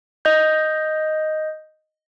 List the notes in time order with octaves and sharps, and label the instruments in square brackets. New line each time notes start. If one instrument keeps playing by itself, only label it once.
[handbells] D#5 G6